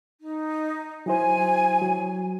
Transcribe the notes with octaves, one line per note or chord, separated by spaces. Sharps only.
D#4
F#3 E4 C5 G#5
F#3